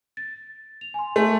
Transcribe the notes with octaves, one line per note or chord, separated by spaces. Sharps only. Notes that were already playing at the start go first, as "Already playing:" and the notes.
A6
F7
G#5 C6
A3 G#5 C6